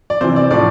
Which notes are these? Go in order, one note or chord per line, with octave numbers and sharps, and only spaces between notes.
D5
C3 E3 C5
D5
A2 F3 D5